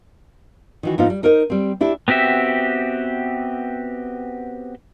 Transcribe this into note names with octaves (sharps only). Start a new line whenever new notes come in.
D#3 E3 F#4
G#2 F3 B3 D#4 F4 C5
G3
D#4 A#4 C5 D5 D#5
G3 C4
D4 E4 G4
B3 C4 F#4 G4 E5